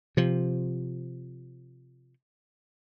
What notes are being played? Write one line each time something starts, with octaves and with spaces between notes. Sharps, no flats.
C3 F3